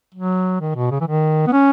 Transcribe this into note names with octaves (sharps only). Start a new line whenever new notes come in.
F#3
D#3
B2
C#3
E3
D#3
B3
C#4